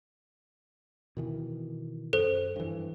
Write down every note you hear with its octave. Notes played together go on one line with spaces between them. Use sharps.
B2 D#3 E3
F#2 A4 C5
G2 E3